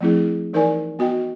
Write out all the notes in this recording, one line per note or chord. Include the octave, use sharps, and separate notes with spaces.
F3 A3 C4 E4 G#4
E3 D#4 A#4 C5 D5 G#5
B3 F#4 D#5 G5